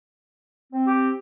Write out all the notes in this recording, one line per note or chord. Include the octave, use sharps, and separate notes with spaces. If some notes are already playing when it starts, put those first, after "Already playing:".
C4
G4